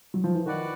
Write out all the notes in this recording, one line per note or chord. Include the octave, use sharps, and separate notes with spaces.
F#3
F3
E3
D#3 F#4 B4 D5 F#5